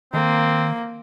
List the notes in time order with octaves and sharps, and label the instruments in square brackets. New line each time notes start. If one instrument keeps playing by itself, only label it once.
[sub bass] D#3 [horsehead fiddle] A#3 [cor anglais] C4